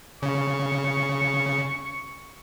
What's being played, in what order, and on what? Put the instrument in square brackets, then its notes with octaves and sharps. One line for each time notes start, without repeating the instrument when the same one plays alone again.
[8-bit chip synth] C#3 [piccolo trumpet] C#6